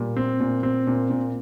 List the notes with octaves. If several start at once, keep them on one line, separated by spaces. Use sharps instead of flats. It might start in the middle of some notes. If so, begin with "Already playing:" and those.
Already playing: A#2 G3
C4
A#2
C4
A#2
A#2